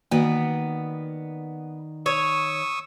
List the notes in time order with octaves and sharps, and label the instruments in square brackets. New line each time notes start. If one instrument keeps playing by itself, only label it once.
[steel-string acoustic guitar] D#3 D5 [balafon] A#3 F#4 [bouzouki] B3
[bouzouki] C#5 [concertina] C#6 D#6 E6